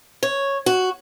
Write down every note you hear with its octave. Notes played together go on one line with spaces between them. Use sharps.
C#5
F#4